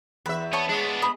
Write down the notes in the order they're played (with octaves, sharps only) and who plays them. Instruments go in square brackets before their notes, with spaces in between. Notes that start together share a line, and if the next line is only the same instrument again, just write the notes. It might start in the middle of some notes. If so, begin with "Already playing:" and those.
[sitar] E2 E5 [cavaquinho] B4
[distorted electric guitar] B3 [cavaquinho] C#5 A5 C#6
[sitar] G#3 [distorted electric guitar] B3 D4
[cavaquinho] B5 D#6